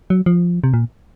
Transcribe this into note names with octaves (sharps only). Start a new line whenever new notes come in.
F#3
F3
C3
A#2